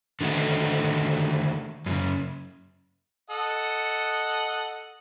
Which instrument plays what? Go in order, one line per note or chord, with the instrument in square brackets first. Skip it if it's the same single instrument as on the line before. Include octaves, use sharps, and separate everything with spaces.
[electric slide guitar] D3 D#3 A3 F#4
F#2 A2 C#3
[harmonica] A4 D#5 F#5